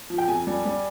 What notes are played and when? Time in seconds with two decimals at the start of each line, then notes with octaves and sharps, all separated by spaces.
0.10 F3
0.18 G5
0.28 F2 G#5
0.47 G3
0.65 G3